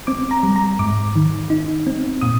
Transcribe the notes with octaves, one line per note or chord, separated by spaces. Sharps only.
C4 D6
A#5
G3
A#5
G#2 D6
D#3
D#4
C4
A#2 D#6